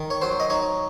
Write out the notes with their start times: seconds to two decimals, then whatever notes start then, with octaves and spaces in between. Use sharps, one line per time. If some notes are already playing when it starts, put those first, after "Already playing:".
Already playing: D#3
0.10 C#5
0.22 F#3 C5
0.40 D#5
0.50 D#4 C#5